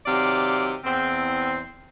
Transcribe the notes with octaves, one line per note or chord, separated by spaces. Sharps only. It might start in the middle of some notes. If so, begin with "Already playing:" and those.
C3 D#3 F#3 D5 F5
E2 C4